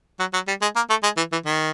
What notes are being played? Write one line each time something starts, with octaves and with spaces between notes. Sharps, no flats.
F#3
F#3
G3
G#3
A#3
A3
G#3
E3
E3
D#3